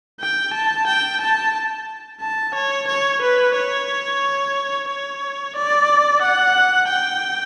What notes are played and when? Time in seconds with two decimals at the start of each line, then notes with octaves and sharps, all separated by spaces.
0.21 G5
0.54 A5
0.87 G5
1.22 A5
2.21 A5
2.55 C#5
2.88 C#5
3.22 B4
3.55 C#5
4.89 C#5
5.56 D5
6.22 F#5
6.89 G5